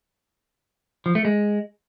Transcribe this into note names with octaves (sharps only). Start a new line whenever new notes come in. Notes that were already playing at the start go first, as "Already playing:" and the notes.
F3
A3
G#3